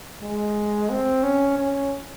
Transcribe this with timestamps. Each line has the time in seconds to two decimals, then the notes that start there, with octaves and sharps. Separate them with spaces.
0.22 G#3
0.90 C4
1.23 C#4
1.58 C#4